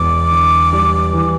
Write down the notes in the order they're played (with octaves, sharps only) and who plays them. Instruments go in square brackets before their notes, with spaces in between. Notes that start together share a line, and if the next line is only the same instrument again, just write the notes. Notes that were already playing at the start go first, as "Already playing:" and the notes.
Already playing: [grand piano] E1 E2 [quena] D6
[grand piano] D3
G3
E3